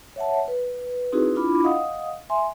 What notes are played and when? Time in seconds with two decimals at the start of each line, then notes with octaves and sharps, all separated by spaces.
0.16 C#5 E5 F#5 A5
0.48 B4
1.12 C4 D#4 E4 F#4 G#4 B4
1.35 D4 E4 F4 B5 D6
1.64 D#5 F5 F#5 D#6
2.30 E5 G#5 C6